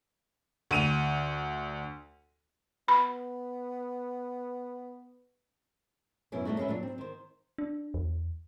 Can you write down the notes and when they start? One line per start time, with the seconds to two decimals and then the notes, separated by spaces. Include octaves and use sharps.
0.71 D2 D#7 F7
2.88 B3 B5
6.32 F#2 B2 E3 C#4
6.45 C3 G3 A3 D#4 F#4
6.57 C#3 G#3 C#4 B4 E5
6.68 A#2 F#3 D4
6.83 C4
6.98 D#3 C5
7.58 D4
7.94 E2